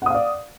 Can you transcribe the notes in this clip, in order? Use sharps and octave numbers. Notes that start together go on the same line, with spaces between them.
D5 F5 F#5 D#6